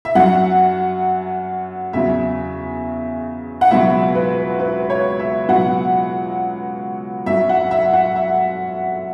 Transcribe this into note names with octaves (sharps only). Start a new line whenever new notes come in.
E5
F#2 F#3 F#5
E2 C#3 F#3 E5
F#5
C#2 B2 F#3 E5
B4
B4
C#5
E5
C#2 B2 F#3 F#5
F#2 F#3 E5
F#5
E5
F#5
E5